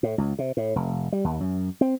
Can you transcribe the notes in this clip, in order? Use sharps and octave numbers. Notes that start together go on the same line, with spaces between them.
A2
C#2
C3
A2
F1
G3
D#2
F#2
C4